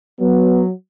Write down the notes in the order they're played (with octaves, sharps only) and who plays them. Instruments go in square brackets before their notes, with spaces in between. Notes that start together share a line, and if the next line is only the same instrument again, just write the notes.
[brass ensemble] F#3 [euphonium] B3